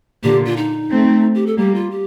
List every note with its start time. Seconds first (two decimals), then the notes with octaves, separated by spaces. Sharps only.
0.23 A#2 D3 G4
0.46 F4
0.57 D#4
0.90 A3 C4
1.35 G4
1.47 A4
1.57 G3 A#3 G4
1.75 F4
1.91 G4